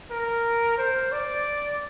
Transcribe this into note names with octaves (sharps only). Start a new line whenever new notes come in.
A#4
C5
D5